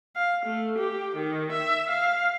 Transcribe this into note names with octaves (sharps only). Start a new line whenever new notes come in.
F5
A3
G4
D#3
E5
F5